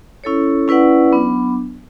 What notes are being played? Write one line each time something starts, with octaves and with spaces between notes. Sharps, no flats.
C#4 E4 A4 C#5
C#4 E4 B4 D5 F#5
F#3 B3 D4